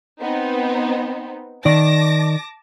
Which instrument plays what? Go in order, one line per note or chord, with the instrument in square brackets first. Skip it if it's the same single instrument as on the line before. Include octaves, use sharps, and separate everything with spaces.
[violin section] B3 C4 D#4
[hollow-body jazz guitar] D#3 D5 [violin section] A5 D6 A#6